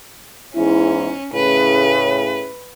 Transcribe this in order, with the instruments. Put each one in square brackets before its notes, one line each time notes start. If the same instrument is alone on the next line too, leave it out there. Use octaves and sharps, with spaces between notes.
[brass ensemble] E2 G#2 E4 [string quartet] C#4
[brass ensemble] A2 C#3 [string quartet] B4